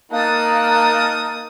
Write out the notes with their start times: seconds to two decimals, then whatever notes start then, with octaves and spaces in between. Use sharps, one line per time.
0.12 A#3 D#4 A#4 F5 A5 D#6 F#6